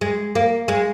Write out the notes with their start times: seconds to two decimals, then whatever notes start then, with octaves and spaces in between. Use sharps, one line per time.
0.01 G#3
0.35 A#3
0.68 G#3